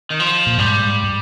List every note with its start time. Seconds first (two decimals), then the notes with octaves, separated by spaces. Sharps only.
0.10 D#3
0.20 F3
0.46 A#2
0.58 G#2 G3